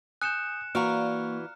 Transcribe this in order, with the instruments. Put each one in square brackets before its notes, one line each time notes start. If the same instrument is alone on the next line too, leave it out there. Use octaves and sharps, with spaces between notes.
[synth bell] G#5 [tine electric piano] D#6 G6 [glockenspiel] F#6 C#7 E7
[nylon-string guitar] E3 F#4 [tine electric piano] A#3 C#6 [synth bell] D5 F5 A#5 [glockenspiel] F6